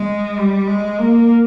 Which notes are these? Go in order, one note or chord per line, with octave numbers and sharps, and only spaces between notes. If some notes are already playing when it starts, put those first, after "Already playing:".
Already playing: G#3
G3
G#3
A#3